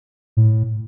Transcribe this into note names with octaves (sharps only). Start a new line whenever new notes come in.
A2